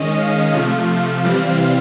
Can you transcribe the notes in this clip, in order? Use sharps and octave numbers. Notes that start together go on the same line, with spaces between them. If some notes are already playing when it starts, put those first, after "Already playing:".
Already playing: D#3 G#3 C#4 D#5
F5
C3 F3 A3
C3 E3 G3 C4